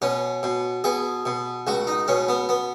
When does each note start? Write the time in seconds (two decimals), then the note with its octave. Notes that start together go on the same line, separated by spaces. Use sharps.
0.02 B2 C#4
0.43 B2
0.84 B2 G#4
1.25 B2
1.67 C#2 F#4
1.87 D#4
2.08 B2 C#4
2.28 B3
2.49 B3